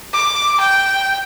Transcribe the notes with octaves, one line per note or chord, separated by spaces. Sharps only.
D6
G5